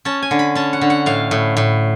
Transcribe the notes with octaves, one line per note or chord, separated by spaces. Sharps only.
C#4 A5
G#5
D3
B5
C#4 A5
F#5
D3
F#5
A2 F5
A2
A2